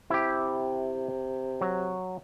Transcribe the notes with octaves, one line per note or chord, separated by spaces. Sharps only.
C3 E4 G4
F#3